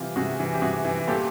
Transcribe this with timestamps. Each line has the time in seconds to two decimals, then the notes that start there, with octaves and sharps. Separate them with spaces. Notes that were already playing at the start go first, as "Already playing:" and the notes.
Already playing: C3 E3 F4 G4
0.16 C3 F#4 G#4
0.39 E3
0.54 G4
0.62 C3 F#4 G#4
0.85 E3
1.07 A#2 G4 A4